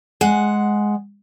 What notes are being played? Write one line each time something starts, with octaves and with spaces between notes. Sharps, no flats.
G#3 F#5